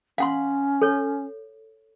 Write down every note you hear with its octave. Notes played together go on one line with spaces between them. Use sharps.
C#4 F5 F#5 C6
A4 C#5